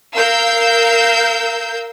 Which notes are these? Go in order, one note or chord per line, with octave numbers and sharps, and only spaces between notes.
A#4 F5 E6 G6